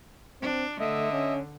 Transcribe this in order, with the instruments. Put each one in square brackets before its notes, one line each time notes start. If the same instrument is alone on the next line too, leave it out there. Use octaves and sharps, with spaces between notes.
[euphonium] C4 [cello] D4
[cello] D3 [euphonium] A3 [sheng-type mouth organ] D#5 E5
[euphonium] C#4